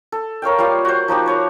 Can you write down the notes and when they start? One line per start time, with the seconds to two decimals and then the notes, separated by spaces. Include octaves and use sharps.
0.12 A4
0.42 A#4 C#5 F5 G5
0.58 G3 A#3 F4 F5
0.85 F#4 C5
1.08 F3 D#4 F#4 G4
1.26 B4 C#5 A#5